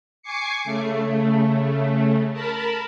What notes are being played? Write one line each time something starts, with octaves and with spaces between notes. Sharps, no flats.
G#5 C#6 D6 C7 C#7
C#3 A3
A#4 A5 B5